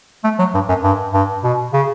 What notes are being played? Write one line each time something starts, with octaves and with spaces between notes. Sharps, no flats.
A3
F#3
G2
F#2
G2
G2
B2
C#3